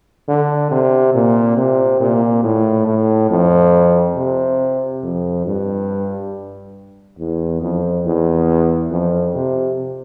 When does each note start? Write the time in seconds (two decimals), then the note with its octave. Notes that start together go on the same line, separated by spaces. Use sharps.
0.28 D3
0.71 C3
1.14 A#2
1.57 C3
2.00 A#2
2.44 A2
2.87 A2
3.30 F2
4.17 C3
5.03 F2
5.46 G2
7.19 E2
7.62 F2
8.05 E2
8.91 F2
9.35 C3